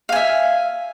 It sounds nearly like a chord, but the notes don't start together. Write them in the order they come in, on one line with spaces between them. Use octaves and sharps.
F5 G#5 E5